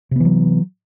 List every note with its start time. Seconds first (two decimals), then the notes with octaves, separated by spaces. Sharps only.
0.11 C3
0.16 B3
0.20 E3
0.25 F#3